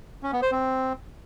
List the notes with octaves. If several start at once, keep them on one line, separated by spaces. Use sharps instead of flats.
C#4
B3
C5
C4